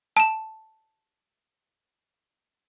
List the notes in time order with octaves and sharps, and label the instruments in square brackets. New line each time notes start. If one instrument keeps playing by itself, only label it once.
[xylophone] A5 E7